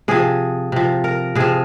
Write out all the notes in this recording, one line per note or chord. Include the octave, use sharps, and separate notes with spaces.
C3 F3 G#4
C3 F3
A#4
C3 F3 G#4